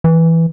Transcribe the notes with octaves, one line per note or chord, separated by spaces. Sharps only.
E3